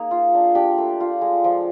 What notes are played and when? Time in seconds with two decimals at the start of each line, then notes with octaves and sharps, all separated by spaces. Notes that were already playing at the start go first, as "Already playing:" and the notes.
Already playing: A#3 D#4 G#4
0.11 F4
0.34 D4
0.55 D4 G4
0.78 A3
1.00 F4
1.21 G#3
1.44 F3